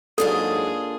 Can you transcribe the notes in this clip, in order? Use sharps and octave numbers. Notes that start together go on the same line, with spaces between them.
G#2 F#3 A#3 D4 F4 G#4 A4